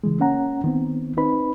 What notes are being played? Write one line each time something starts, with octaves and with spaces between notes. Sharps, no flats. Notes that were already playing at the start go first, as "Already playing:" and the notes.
C#3 E3 G#3
A#3 C#4 F#5 A#5
D#3 B3 C4
C4 D#4 B4 B5